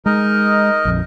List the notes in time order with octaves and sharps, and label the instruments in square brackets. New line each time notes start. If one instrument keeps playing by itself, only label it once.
[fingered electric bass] G#3 [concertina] D#4 A#4 D#5
[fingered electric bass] A#1 F2